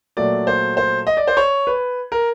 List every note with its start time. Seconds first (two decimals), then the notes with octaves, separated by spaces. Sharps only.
0.17 A#2 F#3 A3 D5
0.47 C5
0.77 C5
1.07 D#5
1.17 D5
1.27 C5
1.37 C#5
1.67 B4
2.12 A#4